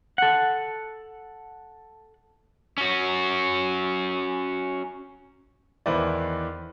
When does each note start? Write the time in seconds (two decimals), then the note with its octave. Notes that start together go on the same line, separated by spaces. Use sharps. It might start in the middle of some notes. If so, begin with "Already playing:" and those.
0.18 A4 F#5
2.78 C#4 F#4
5.86 E2 D#3 E4 B4 C5 D5